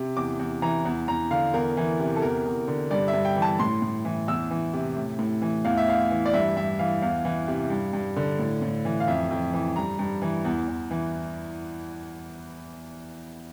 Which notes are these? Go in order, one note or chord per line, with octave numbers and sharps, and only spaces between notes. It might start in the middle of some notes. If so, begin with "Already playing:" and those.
Already playing: C3
E2 D6
E2
E3 A#5
E2
E2 A#5
D3 F5
E2 A#4
E3
C3
A4
E2 A#4
E2
D3
G2 D5
E5
G2
G5
E3
A5
A2 C6
A2
E3
E2 E6
E3
C3
A2
A2
E3
E2 F5
E5
E2 F5
E3
D5
G2 E5
G2 E5
E3 F5
E2 F5
E3
C3
G2
G2
D3
A2
A2
E3
F5
F2 E5
F2
E3
G2 A#5
G2
E3
E2
E2
E3